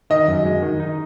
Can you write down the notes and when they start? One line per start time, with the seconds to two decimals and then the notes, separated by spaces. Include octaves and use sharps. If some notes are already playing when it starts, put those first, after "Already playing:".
0.10 D#3 D#5
0.28 F#2
0.45 G#3
0.62 D#3
0.80 D#4